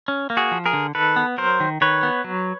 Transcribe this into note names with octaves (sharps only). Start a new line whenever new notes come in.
C#4
A#3
F#4 G#4
F3
G#4 A#4
D3
D#3 A4 B4
B3
F#3 A#4 C5
D#3
D#3 B4 C#5
B3
F#3